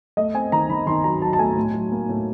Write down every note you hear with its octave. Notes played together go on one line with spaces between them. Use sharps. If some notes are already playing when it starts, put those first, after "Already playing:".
A3 D#5
C4 G#5
D#3 A#5
D#3 B5
D#3 C6
F#3 A#5
F#3 A5
A5
A3 G#5
A2
F#3
A#3
A2